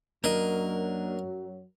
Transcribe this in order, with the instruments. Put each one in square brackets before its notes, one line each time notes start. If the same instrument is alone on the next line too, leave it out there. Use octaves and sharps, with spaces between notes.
[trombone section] F#2 F#3 [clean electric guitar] A#3 D4 D#5 [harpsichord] A#4